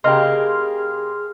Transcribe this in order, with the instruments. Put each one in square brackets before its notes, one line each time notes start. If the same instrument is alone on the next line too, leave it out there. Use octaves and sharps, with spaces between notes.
[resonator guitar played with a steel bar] C#3 A#3 G4 [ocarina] G#4 [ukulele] D#5 [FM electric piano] C6 F6